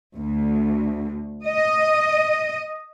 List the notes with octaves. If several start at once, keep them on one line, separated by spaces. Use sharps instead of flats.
D2
D#5